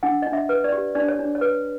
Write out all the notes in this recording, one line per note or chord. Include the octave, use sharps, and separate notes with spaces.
D4 F#5
D4 D#5
E5
B4
D5
G4
D4 D5
C#5
D4
C#5
B4